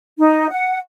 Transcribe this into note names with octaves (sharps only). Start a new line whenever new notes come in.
D#4
F#5